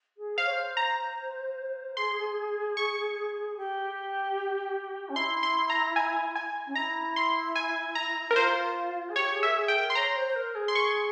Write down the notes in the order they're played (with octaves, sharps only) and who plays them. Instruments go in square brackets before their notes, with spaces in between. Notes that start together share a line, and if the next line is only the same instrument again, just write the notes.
[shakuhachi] G#4
[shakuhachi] C5 [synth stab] F5
[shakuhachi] C#5
C5
[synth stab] A#5
[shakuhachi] G#4 [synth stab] C6
[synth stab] C#6
[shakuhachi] G4
C#4
[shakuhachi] E4 [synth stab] C6
[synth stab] C6
A#5
G#5
G#5
[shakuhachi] C#4
[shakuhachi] E4 [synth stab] A#5
[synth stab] C6
G#5
A#5
[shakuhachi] E4 [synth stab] A#4
[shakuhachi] F4 [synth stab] C5
[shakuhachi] G#4
[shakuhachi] G4 [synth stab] C#5
[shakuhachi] G#4
[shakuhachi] A#4 [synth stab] E5
[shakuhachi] G#4
[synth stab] G5
[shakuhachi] A#4
[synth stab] C6
[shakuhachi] C#5 [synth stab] A#5
[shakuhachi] C5
C5
A#4
G#4
[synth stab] C6
C#6